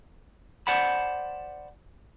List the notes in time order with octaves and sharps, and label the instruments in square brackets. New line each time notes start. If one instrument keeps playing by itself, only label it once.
[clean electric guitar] C5 D5 F#5 A5 B5